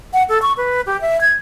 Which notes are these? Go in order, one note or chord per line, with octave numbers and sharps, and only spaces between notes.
F#5
A4
C#6
B4
G4
E5
G#6